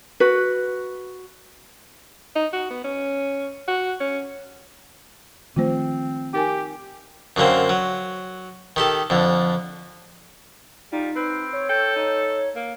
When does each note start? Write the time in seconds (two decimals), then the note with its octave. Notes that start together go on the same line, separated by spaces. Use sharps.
0.20 F#4 B4
2.35 D#4
2.53 F#4
2.70 B3
2.84 C#4
3.68 F#4
4.00 C#4
5.56 D#3 F3 A3 C4 F4 C5
6.33 D#4 G4 A#4 G#5
7.36 F#2 D3 A#3 C4
7.69 F#3
8.76 D#3 G4 A4
9.10 F2 D3
10.92 G3 D#4 F4
11.16 C4 B4
11.53 C#5
11.69 A4 G5
11.96 D#4
12.55 A#3